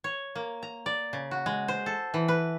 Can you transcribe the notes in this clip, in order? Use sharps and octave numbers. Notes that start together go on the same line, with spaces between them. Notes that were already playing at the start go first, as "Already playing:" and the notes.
C#5
A#3
A#5
D5
C#3
F#4
G#3
C5
A4
E3
B4